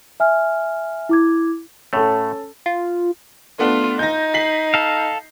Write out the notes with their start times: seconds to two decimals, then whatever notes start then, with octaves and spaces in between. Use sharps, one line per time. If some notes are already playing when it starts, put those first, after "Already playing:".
0.20 E5 G#5 F6
1.09 E4 D6 G#6
1.93 A2 A3 C#4 A4
2.66 F4
3.59 A3 B3 D4 F4
3.99 D#4 G6 A#6
4.34 B6 C7 F#7
4.74 A4 F5